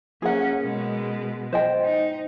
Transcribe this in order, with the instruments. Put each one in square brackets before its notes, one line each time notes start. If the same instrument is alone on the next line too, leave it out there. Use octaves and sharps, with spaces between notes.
[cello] A#3 C#4 [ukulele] G#4 A#4 F#5
[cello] B2 G#3
[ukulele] C5 D#5 G5
[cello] D#4